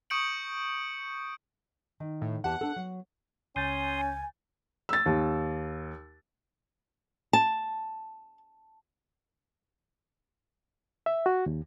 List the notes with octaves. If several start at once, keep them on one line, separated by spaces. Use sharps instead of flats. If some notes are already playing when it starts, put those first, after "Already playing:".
C#6 D#6 G6 C#7 D7 F#7
D#3
A2
E2 G4 F#5 A5
D4 A4
F#3
C#2 C#4 G#5 C6 D#6 G6 A6
E6 A6
D#2
A5
E5
F#4
D#2